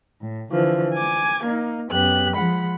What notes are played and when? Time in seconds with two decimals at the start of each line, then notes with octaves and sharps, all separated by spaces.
0.21 A2
0.52 D3 E3 F3
0.94 G#5 D6 G#6
1.43 A#3 D#4
1.90 F#2 B3 G4 F#6
2.36 F3 G#3 F#5 B5